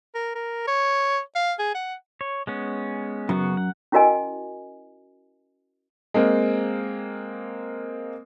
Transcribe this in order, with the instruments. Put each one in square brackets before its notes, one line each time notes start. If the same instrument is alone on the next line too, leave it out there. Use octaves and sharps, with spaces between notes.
[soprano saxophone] A#4
A#4
C#5
F5
G#4
F#5
[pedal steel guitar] C#5
G#3 B3 C#4
[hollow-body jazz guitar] F#2 [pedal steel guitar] C#3 B3 F#4
[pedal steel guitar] F#5
[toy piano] C#4 E4 F#4 A#4 D#5 G#5
[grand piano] G#3 A#3 C4